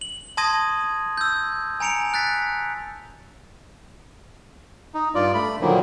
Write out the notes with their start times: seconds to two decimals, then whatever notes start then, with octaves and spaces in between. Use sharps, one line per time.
0.01 F#7
0.37 A5 C6 D#6 G#6 A#6 D#7
1.17 E6 G6
1.80 G#5 A#5 C#7 D7 F7
2.14 F#6 A6 B6
4.94 D#4
5.15 G2 F4 D5
5.34 A3 B5
5.61 A#2 D3 D#3 F3 F#3 A#3